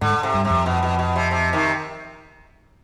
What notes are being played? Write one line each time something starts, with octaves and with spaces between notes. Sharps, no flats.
G#2 D3
C3
G2
C3
F2
B2
B2
B2
C3
C3
C3 D#3